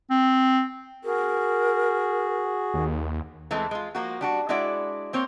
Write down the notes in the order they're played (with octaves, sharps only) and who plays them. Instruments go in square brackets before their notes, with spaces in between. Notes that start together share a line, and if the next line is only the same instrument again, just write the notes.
[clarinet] C4
[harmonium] F#4 G#4 [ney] A#4
[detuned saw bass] D#2
[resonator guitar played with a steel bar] E3 G#3 A3 C4 E4
G#3 F4
F3 A#3 F#4
G3 D4 F#4
G#3 D4 E4 F#4 D5
A#3 C4 C5 C#5